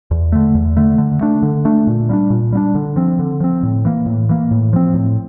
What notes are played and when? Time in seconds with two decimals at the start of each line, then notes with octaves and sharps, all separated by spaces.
0.11 E2
0.32 D3 A3
0.55 E2
0.77 D3 A3
0.98 D3
1.21 A3 D4
1.42 D3
1.65 A3 D4
1.87 A#2
2.09 G3 A#3 D4
2.30 A#2
2.52 G3 A#3 D4
2.75 D3
2.96 F3 C4
3.19 D3
3.40 F3 C4
3.63 A2
3.85 E3 A#3
4.06 A2
4.29 E3 A#3
4.51 A2
4.73 F3 C4
4.94 A2